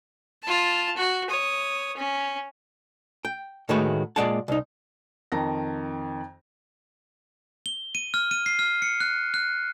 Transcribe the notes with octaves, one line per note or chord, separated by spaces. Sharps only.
F4 A5
F#4
C#5 D#6
C#4
G5
A2 D#3 G#3 A3 F#4 B4
A#2 C#3 G#3 D5 F#5 A5
C2 D#4
F2 D#3 A5 A#5 A#6
G7
D#7
F6
D#7
C7
F6
C#7
F#6
F#6